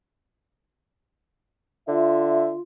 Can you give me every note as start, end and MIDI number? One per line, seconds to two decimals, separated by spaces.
1.88 2.54 50
1.88 2.61 65
1.88 2.50 76